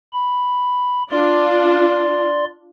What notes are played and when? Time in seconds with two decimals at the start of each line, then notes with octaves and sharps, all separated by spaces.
0.13 B5
1.11 D4 F4 D5 C6